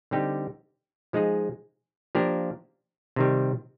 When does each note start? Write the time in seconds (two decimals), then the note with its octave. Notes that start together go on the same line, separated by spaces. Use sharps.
0.11 D3 G3 C4 D#4 G4
1.13 F3 G#3 D#4 G#4
2.15 F3 A#3 D4 G4 A#4
3.16 C3 D#3 G3